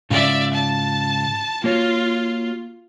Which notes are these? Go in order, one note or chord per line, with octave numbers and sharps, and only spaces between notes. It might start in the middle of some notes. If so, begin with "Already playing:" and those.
G#2 C#3 F4 D5 E5
A5
A#3 F4 F#4 C#5